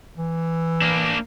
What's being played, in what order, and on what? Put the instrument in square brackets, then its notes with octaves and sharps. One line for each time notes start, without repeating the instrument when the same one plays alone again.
[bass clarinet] E3
[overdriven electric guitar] A#3 D4